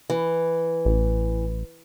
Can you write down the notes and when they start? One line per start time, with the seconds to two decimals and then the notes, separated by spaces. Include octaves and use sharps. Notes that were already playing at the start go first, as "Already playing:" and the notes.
0.10 E3
0.85 A1